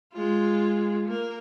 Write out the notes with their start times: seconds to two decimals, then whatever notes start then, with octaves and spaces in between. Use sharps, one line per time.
0.14 G#3 F4
1.08 A#3 A#4